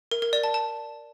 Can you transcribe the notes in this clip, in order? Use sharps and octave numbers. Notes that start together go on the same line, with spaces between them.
A#4
A#4
D5
A5
A5